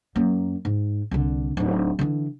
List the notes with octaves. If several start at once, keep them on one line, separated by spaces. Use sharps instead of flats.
F#2 A#3
G#2
C2 D3
D1 D#4
D3 E3